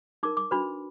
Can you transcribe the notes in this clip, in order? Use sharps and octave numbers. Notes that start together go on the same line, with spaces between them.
D#4 A#4 D6
D6
D4 F#4 B4 B5